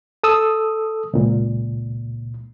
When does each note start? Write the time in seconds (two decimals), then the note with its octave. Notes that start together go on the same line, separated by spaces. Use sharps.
0.24 A4 D#6 E6
1.13 C#2 A#2